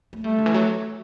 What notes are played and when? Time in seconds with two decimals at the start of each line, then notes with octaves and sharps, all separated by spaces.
0.13 A3
0.24 G3 A3
0.38 D3
0.46 E3
0.54 F#3